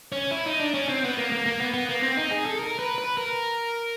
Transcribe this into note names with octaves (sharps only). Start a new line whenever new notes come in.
C#4
E4
D#4
D4
C#4
C4
B3
A#3
A#3
A#3
B3
B3
A#3
C4
D#4
G#4
A4
A#4
B4
B4
A#4